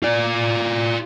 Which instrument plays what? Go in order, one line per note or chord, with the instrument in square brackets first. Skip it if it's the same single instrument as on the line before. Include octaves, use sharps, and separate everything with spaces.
[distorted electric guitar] F4 D5